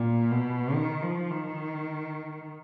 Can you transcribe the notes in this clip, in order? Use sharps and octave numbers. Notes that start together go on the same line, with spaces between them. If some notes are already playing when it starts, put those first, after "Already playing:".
Already playing: A#2
B2
D#3
F3
D#3